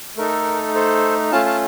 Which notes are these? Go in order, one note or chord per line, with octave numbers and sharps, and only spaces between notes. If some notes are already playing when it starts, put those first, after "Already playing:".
A3 D#4 A4 A#4
A4 C5
A3 C#4 F4 F5 A5
F5 A5